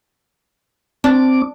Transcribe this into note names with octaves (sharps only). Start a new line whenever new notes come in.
C4 D4 D6